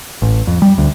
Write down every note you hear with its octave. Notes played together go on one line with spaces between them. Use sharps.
A1
F2
G3
D2